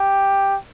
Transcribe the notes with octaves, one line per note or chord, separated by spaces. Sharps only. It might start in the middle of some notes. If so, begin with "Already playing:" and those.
Already playing: G4